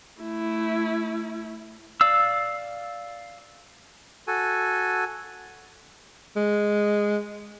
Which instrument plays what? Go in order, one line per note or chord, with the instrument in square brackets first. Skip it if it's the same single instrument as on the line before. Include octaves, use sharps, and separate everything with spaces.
[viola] A3 E4
[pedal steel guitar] D5 F5 E6
[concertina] F#4 A4 G#5
[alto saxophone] G#3